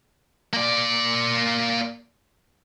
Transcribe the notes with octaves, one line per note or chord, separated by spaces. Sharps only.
A#3 D5